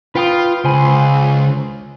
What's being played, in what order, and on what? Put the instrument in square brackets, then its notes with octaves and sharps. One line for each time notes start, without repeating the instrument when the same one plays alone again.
[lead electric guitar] F4 [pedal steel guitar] B4 G5 D#6
[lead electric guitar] C#2 [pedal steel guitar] C5 G#5 B5